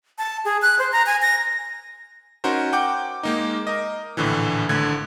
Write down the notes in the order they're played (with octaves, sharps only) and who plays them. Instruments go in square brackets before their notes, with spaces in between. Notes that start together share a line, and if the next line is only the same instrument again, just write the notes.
[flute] A5
G#4
F#6
C5
A#5
G#5
A#6
[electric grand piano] C#4 D#4 F#4 A#4 C5
F#5 G5 D6 G6
G#3 A#3 D#4
A#4 D#5
A#1 A2 D3 E3
G#1 D3 A3 G#6